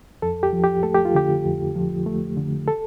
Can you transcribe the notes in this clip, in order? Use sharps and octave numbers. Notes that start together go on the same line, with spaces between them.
F2 A4
G4
F3
G4
A3 A4
G4
F4
D3 G4
F2
F3
A3
D3
A4